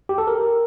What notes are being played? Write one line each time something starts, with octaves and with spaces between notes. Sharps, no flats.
G4
A4
A#4